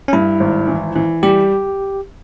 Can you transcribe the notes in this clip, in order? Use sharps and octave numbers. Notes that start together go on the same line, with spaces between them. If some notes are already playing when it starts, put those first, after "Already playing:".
C#4
G2 E4
G#1
E3
E3
G3 G4